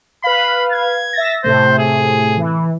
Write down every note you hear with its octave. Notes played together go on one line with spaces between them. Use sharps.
B4 F5 B5
G#6
E5 A6 A#6
A2 C3 A3 C5
G#4
E3